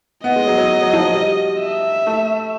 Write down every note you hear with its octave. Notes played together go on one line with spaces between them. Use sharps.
B3 D#5
G#3
F#3
F#3
F#3
F3
F#3
G3
E5
A3